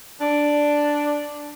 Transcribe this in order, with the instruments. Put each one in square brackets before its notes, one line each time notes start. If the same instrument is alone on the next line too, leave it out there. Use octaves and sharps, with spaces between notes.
[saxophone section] D4